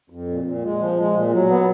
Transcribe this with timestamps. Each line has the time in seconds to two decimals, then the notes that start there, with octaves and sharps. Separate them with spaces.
0.10 F2
0.28 A#2
0.44 A#2
0.63 G#3
0.79 F3
0.97 G#3
1.13 A#2
1.31 F#3
1.49 B3